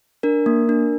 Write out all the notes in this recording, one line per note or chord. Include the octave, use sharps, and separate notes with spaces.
D4 A#4
A#3
D4